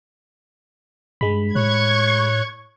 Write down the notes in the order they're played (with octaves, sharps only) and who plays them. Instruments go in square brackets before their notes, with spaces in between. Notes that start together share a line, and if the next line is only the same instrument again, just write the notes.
[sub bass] G2 [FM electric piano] G#3 B5
[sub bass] A2 [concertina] C#5 F#6 [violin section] C#6 G#6